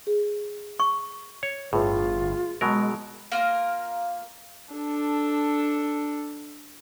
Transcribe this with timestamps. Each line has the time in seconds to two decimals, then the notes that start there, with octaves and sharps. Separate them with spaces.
0.07 G#4
0.80 C#6
1.43 C#5
1.73 G1 A2 F4 G#4 B4
2.61 B2 F#3 G#3 A#4
3.32 A#3 F4 A#4
4.74 D4 A4